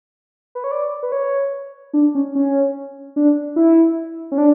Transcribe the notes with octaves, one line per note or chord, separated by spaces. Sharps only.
B4
C#5
D5
B4
C#5
D4
C#4
C#4
D4
E4
C#4
D4